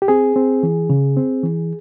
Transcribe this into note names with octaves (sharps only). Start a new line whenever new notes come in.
G4
C4 G#4
C4
E3
C#3
C4
E3